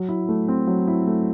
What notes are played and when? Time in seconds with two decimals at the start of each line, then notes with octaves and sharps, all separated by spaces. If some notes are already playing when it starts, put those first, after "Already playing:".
Already playing: F#3
0.09 E4
0.29 A3
0.48 C4
0.67 F#3
0.87 E4
1.07 A3